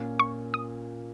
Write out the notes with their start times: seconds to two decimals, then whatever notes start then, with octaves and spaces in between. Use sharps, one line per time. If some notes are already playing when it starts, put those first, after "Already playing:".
Already playing: A#2 A#3 C#4
0.19 C#6
0.54 D#6